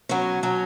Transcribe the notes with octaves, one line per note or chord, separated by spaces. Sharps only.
B2 F#3 C#4
B2 F#3 C#4